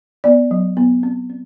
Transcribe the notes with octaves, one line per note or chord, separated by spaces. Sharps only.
B3 D5
F#3
B3
C4
C4